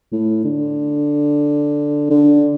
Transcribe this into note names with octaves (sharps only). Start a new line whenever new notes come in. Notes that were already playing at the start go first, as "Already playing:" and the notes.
A2
D3
D3